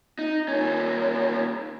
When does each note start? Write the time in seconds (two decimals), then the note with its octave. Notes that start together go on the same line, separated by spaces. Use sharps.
0.19 D#4
0.48 D#2 C#4